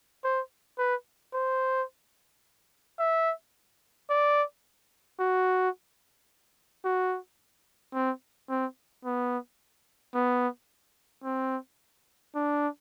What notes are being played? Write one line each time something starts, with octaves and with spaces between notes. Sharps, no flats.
C5
B4
C5
E5
D5
F#4
F#4
C4
C4
B3
B3
C4
D4